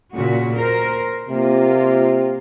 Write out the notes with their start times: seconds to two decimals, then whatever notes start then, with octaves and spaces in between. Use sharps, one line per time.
0.15 A#2 C#3 F#4
0.56 A#4 C5
1.29 C3 A#3 F4